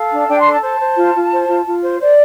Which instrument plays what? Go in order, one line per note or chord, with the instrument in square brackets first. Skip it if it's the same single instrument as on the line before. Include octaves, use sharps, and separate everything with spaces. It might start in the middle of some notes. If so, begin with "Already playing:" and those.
Already playing: [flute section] A4 F5
D4
D4 G5
C6
A4
A5
C5 A5
C5
F4
F4
C5
F4
F4
C5
C5 D5